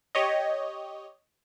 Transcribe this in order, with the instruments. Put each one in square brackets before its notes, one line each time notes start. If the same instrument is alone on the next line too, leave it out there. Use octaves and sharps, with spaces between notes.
[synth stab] G4 C#5 D#5